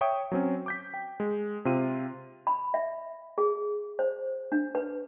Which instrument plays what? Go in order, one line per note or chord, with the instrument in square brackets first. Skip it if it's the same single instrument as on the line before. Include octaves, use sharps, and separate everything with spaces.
[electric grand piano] C#5 E5 G5 C#6 D#6
F#3 C4 C#4
D6 G6 B6
G5
G#3
C3 C4 F4 D#7
[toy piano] B5
E5
G#4
C5
D4
B4